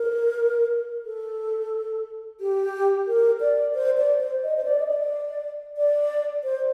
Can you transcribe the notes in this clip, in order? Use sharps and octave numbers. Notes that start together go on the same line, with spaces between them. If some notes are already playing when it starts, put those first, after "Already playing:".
Already playing: A#4
A4
G4
A#4
D5
C5
D5
C5
D#5
C5
D5
D#5
D5
D5
C5